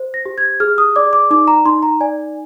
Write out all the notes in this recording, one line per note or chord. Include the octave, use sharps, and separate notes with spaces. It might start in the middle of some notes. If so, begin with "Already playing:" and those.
Already playing: C5
A#6
G4
G#6
G#4 F6
D#6
D5 D6
D6
D#4 D6
A#5
D#4 C6
A#5
D5 G#5